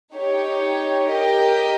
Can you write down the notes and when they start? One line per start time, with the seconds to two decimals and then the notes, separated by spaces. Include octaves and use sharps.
0.14 D#4 G4 C#5
1.09 G4 A#4 D#5 G5